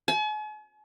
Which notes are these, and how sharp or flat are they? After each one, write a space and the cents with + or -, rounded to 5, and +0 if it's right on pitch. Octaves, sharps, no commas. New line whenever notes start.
G#5 +45